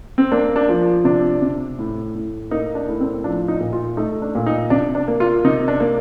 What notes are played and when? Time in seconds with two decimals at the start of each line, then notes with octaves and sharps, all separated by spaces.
0.18 C4
0.32 A#3 D4
0.56 D4
0.69 F3
1.04 C3 D4
1.42 C3
1.79 A2
2.15 A2
2.51 A#3 D#4
2.75 D4
2.89 A2
3.00 C4
3.24 F3 D4
3.48 D#4
3.61 A#2
3.73 F4
3.97 A3 D#4
4.22 D4
4.35 A#2
4.46 D#4
4.70 C3 D4
4.95 D4
5.08 A#3
5.20 F4
5.44 C3 D#4
5.68 D4
5.80 A#3